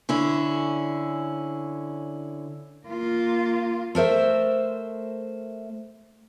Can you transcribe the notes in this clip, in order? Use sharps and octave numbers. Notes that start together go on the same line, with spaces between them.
D3 C#4 E4
A#3 F4
A3 A#4 C5 E5